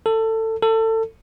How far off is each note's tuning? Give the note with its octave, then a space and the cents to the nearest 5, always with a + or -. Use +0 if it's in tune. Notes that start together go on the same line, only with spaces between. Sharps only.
A4 +20
A4 +25